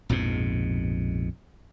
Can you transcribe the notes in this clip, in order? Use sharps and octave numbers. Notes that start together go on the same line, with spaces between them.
A#1 F2 G#2 B2